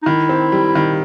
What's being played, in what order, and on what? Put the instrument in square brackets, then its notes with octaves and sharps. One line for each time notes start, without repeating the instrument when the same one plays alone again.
[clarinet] D#4
[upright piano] D#3 [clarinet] E4
[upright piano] C4
G3
D#3